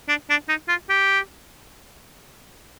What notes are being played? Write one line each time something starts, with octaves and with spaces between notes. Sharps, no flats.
D4
D4
D#4
F4
G4